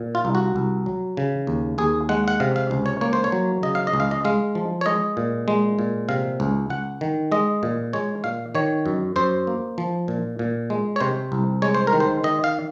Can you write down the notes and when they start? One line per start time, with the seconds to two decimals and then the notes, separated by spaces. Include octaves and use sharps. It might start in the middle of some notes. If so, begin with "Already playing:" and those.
Already playing: A#2
0.15 F4
0.25 C2
0.35 F#4
0.56 C2
0.86 F#3
1.17 C#3
1.47 D#2
1.78 D#2 G#4
2.09 G#3 F#5
2.28 F#5
2.40 C3 F5
2.56 F5
2.71 C#2
2.86 C#5
3.01 A#3 C#5
3.13 C5
3.24 C#5
3.32 F#3
3.63 C#3 D#5
3.75 F5
3.87 D#5
3.93 C#2
4.00 F5
4.11 D#5
4.25 G#3 F5
4.55 F3
4.81 C#5
4.86 G#3 D#5
5.17 A#2
5.48 G#3
5.79 A#2
6.09 C3 F5
6.40 C#2
6.70 C#2 F#5
7.01 D#3
7.32 G#3 D#5
7.63 A#2
7.93 G#3 C#5
8.24 A#2 F5
8.55 D#3 C#5
8.86 F#2
9.16 F#2 C5
9.47 A#3
9.78 F3
10.08 A#2
10.39 A#2
10.70 G#3
10.96 C#5
11.01 C3 C5
11.32 C2
11.62 G#3 C#5
11.74 C5
11.87 A#4
11.93 D#3
12.00 C5
12.24 D#3 D#5
12.44 F5